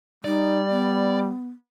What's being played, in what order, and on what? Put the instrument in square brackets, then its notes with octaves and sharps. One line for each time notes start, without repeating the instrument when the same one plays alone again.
[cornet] G3 [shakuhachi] D#4 [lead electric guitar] D5
[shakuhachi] B3